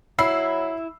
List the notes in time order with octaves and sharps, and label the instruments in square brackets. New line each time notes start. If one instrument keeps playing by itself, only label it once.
[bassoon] F#3 [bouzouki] E4 [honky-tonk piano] B5 E6 C7